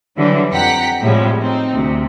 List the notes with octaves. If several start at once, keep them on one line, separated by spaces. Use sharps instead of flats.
D3 E3 F#3 G3
F2 F#5 G5 A#5 B6
A2 C3 F3 G3 G#3
C4 D#4
D2 C3